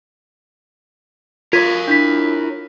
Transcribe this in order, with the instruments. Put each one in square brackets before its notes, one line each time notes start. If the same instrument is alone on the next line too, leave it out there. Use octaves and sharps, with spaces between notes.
[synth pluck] F4 [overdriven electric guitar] A#4 C#5 [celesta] G#6 B6 D#7
[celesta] D4 B6 [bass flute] E4